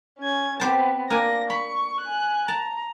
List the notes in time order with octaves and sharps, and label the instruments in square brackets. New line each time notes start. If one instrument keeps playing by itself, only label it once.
[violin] C#4 G#6
[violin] B3 C4 [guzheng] G4 C5 A5
[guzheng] A#3 D4 G#5 [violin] A#6
[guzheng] B5 [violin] C#6
[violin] G#5 F#6
[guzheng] A5 [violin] A#5